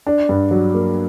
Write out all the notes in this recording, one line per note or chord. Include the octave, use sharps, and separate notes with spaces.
D4
G2
F#3
A#3